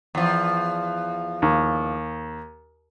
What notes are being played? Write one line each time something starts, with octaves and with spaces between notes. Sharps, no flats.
E2 F3
D#2